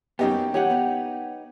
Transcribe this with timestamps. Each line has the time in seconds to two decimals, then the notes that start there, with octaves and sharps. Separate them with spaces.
0.19 F#2 A#3 B3 D#4 G4
0.54 E3 D#4 G4 C#5 F#5
0.70 B3 D#4